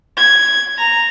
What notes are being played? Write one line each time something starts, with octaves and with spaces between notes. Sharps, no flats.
G#6
A#5